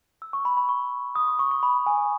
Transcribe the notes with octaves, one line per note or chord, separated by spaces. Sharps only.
E6
C#6
B5
B5
C#6
D#6
C#6
C#6
C#6
B5
G#5